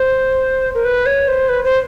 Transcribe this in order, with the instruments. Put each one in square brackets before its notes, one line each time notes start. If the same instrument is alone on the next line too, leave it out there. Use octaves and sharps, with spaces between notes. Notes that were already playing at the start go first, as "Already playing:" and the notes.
Already playing: [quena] C5
A#4
B4
C#5
C5
B4
C5